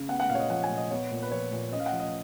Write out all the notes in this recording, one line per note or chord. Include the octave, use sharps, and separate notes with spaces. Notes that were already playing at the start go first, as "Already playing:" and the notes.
Already playing: C#3
B3 F#5
F#5
A#2 F5
C#5
D#5
F3 F#5
G#5
A#2
D#5
B3 C#5
A#2
B4
F3 C#5
A#2
C#4 D#5
F5
F#5
F3
D#5